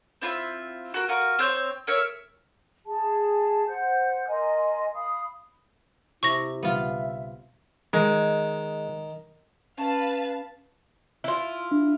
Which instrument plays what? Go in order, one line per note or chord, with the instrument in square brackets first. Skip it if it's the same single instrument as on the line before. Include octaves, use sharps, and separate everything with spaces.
[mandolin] C4 E4 F4
F#4 A#4
F4 F#4 A#4
C4 C5 C#5 G6
A#4 C#5 E5
[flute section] G#4 A5
C5 F#5 G6
A#4 D#5 G#5 C6
F5 B5 D#6
[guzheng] C3 [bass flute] E4 [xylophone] C#6 A#6
[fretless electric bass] B1 C#3 G3 [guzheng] B3 F4 [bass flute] E5
[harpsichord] D#3 [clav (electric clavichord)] G#3
[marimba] C#4 [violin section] B4 F5 A5
[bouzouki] E4 F4
[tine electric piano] D4